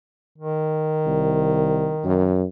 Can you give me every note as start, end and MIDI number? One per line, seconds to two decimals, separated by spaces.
0.38 2.39 51
1.06 1.92 36
2.04 2.44 42